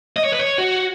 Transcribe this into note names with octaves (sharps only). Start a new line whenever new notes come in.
D#5
C#5
B4
C#5
F#4